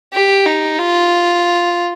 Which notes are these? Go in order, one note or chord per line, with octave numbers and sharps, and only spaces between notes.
G4
D#4
F4